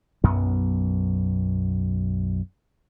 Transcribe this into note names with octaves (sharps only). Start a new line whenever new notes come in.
B1 F#2 B3